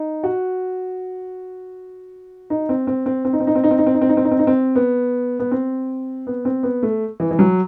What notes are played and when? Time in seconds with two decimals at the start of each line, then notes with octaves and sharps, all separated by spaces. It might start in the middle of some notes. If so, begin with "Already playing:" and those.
Already playing: D#4
0.24 F#4
2.50 D#4
2.69 C4
2.87 C4
3.06 C4
3.25 C4
3.33 D#4
3.40 C4
3.47 D#4
3.55 C4
3.64 D#4
3.71 C4
3.78 D#4
3.86 C4
3.94 D#4
4.01 C4
4.09 D#4
4.17 C4
4.25 D#4
4.31 C4
4.39 D#4
4.47 C4
4.75 B3
5.40 B3
5.51 C4
6.27 B3
6.45 C4
6.63 B3
6.83 A3
7.20 E3
7.31 E3
7.39 F#3